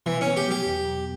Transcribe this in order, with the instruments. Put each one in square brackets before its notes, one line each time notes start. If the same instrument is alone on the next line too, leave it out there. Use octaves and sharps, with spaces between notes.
[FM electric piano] B2 [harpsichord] E3
[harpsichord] C#4
[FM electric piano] B3
[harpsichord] G4
[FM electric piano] F#3 [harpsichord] G4
[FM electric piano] E2
B2